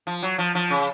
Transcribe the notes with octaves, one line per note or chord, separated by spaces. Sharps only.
F3
F#3
F3
F3
C#3